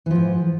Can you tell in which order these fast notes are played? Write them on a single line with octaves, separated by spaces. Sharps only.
E3 F3 G#2